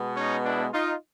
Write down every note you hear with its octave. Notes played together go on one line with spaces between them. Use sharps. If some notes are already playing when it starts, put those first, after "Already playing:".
Already playing: B2 G#3 B3
C#4 D#4
D4 E4
D#4 F4